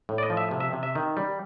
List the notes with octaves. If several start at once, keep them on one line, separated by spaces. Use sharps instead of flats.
A2
D5
D#5
F3
E5
C3
E5
C3
E5
D#3
G3